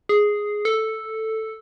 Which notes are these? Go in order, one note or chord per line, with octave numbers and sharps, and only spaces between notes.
G#4
A4